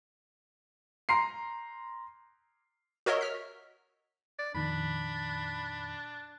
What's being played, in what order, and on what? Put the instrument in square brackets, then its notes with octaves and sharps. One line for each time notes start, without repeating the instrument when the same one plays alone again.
[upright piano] A#5 C6 C7
[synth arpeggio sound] F#4 A#4 C#5 D#5 E5
F6 B6
[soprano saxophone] D5
[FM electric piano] F2 A#2 D#3 [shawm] D4 [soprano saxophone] B5